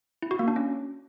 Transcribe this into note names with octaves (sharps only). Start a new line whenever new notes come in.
E4
F#4
A#3
D4
C#4